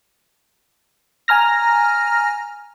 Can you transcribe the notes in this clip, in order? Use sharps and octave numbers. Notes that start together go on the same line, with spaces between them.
G#5 A#5 F6 A#6